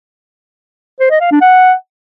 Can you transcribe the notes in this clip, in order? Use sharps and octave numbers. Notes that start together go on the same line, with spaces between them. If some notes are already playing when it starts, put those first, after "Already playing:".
C5
D#5
F5
D4
F#5